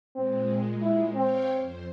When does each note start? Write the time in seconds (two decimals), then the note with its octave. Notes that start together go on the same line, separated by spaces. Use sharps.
0.16 A#2 G#3 C4
0.82 E4
1.14 C4 C#5 F5 G5
1.58 F2 C5